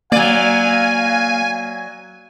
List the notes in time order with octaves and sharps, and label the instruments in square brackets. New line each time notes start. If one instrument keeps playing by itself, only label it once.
[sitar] F#3 D5 [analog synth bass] A#3 [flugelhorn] F5 [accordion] G#5